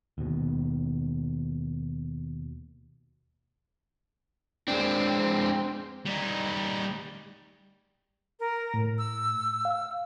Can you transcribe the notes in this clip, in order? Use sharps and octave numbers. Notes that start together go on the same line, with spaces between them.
D#2 B2
G#3 C4 D4
G3 D#4
A#4
A2
E6
F5